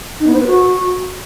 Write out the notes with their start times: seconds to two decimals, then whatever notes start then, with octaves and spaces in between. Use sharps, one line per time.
0.20 D#4
0.27 B3
0.33 C5
0.40 B4
0.47 F#4